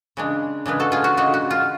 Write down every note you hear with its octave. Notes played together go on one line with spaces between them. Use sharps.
C#3 G#3 D4
C#3 G#3 D4 G#4 B4
F#4 A4
F4 G#4
F#4
C#3 G#3 D4 F#4
F#4
F4